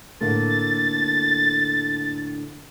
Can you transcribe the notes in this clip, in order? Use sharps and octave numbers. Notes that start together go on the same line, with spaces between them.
A2 D3 A#3 A6